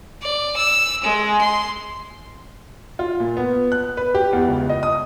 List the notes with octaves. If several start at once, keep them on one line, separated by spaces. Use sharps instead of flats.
D5
E6
G#3
C6
F4
A#2
B3
F#6
B4
G4
E2
C#2
D#5
D#6